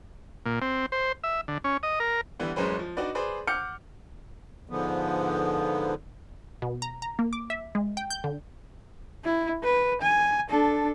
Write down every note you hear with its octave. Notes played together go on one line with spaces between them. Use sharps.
A#2
C4
C5
E5
D3
C#4
D#5
A#4
D3 E3 G3 B3
A1 F#2 G#3 C#4 B4 C5
F3
D4 D#4 F#4 B4 D5
G#4 B4 C5 D5
F#5 D6 F6 G6 C#7
G#2 D3 F3 B3
B2
A#5
A#5
A#3
D6
E5
G#3
G5
G6
D3
E4
B4
G#5
D4 A4